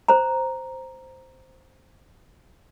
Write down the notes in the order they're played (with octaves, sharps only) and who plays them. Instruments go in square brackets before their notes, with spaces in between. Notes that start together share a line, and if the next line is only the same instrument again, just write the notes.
[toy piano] C5 A#5